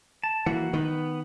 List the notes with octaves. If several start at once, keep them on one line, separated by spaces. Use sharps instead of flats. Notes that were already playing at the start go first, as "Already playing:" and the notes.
A5
E3 A#3 F#4 F#5
D#3 B3 B4